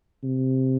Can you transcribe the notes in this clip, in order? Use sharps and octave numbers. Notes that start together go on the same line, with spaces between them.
C3